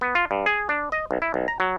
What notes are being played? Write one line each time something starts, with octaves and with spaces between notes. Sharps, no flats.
B3
F4
G2
G#4
D4
D#5
B1
E4
B1
A#5
F#3